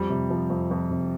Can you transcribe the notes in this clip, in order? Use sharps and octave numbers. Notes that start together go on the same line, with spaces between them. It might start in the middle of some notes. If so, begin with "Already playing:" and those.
Already playing: F2 G3
C3
F3
F2
F2
C3